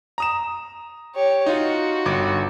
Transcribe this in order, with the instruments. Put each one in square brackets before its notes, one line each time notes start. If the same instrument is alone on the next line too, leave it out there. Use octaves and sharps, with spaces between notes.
[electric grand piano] A#5 D#6 E7
[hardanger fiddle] G4 C#5
[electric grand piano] D#4 F4 [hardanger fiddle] F#4
[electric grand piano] G1 D6